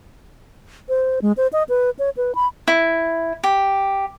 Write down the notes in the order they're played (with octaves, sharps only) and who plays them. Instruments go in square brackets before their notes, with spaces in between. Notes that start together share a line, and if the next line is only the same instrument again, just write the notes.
[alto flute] C5
G#3
C5
D#5
B4
C#5
B4
B5
[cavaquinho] E4
G4